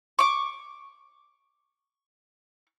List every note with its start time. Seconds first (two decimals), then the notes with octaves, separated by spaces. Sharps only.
0.19 C#6 D6